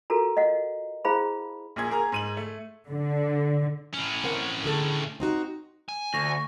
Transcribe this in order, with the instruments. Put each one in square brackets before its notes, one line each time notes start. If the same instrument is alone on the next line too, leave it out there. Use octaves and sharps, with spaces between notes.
[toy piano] F4 F#4 A4 A#4 A#5
D#5 F5 F#5
E4 G#4 C5 F5 A#5 B5
[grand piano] A#1 A#2 G#4 G#6
A#3 G#4 A#4 A#5
G#2 D#7 F#7
A3
[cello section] D3
[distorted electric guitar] A2 C#4
[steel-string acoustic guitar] C4 A#4 F#5
D3 G#4 A4
C4 D#4 F#4
[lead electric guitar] G#5
[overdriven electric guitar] D2 [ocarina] C#6 [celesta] A#6